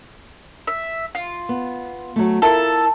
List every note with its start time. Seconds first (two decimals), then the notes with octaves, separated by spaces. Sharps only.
0.67 E5
1.15 F4
1.49 B3
2.16 F#3 A3
2.42 E4 F4 A4 A#4